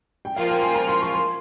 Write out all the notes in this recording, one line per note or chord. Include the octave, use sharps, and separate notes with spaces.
G5
F3 A#3 F4 F5
G5
G#5
A#5
C6
C#6
C6